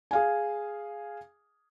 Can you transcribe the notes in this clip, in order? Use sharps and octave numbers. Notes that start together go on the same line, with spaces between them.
G#4 F5 G#5